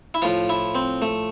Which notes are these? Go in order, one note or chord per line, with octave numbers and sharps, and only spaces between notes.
E4
A2 F3 F4
E4
C4
A3